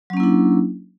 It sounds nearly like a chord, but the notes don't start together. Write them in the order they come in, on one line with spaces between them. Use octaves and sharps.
F#3 C#4 A#3 E4 D4